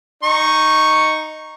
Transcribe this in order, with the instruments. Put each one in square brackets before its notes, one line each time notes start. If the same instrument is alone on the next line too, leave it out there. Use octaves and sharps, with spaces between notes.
[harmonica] D#4 C#6